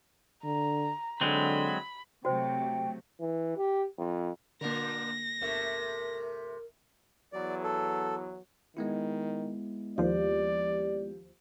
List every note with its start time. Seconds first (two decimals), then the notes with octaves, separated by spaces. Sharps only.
0.44 D3 A#5
1.21 D3 F#3 G#3 C4 B5
2.25 C3 F#3 A3 F#4 C5 G5
3.20 E3
3.57 G4
3.98 F2
4.61 A#2 D3 A#3 D4 A#4 A#6
5.41 G1 C3 A3 A#4 E5
7.33 E2 F#3 D5
7.64 A4
8.77 D#3 G#3 B3 E4
9.98 D#2 F3 G4 D5